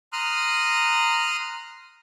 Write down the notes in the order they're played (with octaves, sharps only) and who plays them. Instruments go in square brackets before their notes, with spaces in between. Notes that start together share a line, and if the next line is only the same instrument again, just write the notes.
[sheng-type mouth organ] A#5 C6 D#6 F6 F#6